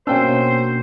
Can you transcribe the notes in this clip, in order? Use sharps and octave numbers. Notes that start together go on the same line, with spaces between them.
B2 A#3 C#4 D4 C5 C#5 G5 E6